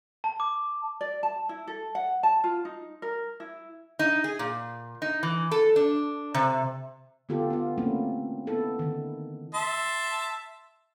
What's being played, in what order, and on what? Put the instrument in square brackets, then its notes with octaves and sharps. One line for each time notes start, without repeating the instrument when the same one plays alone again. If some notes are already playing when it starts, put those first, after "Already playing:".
[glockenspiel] A5
D6
[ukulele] D5
A5
E4
A4
F#5
A5
F4
D#4
A#4
E4
[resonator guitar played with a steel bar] D#4
G#4
A#2
D#4
E3
A4
D4
C3
[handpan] D3 B3 F4 G4 A4
B3 F4
A3 A#3 C4 C#4 E4
B3 E4 A4
D3 D#3
[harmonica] E5 A5 C6